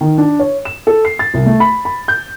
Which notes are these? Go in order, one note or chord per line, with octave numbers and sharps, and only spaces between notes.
D#3
D4
C#5
E7
A4
C7
A6
C2
A3
B5
B5
G6